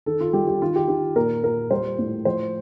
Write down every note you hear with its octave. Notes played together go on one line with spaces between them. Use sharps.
D#3 A4
F4
G3 G4
G4
D#3 F4
G4
D#3 G4
A#2 A#4
A#2 A#4
G3 C5
A2
F3 C5